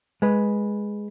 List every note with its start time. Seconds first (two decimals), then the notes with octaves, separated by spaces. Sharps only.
0.22 G#3 B4